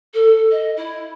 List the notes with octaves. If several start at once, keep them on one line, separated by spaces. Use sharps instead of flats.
A4
D#5
E4